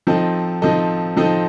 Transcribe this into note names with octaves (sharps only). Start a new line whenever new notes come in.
F3 C4 D#4 A4 D#5
F3 C4 D#4 A4 D#5
F3 C4 D#4 A4 D#5